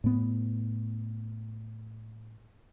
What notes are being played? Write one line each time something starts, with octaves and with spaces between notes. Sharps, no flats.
A2 B3